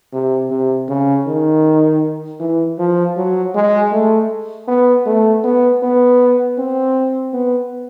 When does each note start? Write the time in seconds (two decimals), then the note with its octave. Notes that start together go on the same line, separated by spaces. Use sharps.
0.13 C3
0.50 C3
0.88 C#3
1.27 D#3
2.40 E3
2.79 F3
3.17 F#3
3.54 G#3
3.92 A3
4.68 B3
5.06 A3
5.44 B3
5.83 B3
6.58 C4
7.33 B3